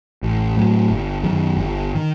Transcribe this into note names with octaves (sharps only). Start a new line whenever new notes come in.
A1
A2 F#3
G1
F#2 D#3
G1
D#3